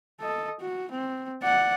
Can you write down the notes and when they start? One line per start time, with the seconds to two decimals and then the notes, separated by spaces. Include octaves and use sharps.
0.20 A4 D#5
0.61 F#4
0.92 C4
1.43 D5 F#5